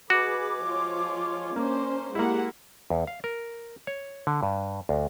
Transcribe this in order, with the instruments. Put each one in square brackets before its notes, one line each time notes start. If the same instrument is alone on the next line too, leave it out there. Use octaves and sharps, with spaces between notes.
[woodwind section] G#3 G#5 D6 [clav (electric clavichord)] F#4 [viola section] G#4 B4
[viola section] F3 F4 C#5
[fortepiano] A#3 [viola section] C#4 D4 C5
[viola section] G#3 G4 F#5 [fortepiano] A#3 E4
[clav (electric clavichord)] E2
F5
A#4
C#5
D3
G2
D2